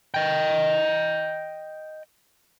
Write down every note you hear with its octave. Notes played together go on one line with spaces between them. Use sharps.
D#5 G5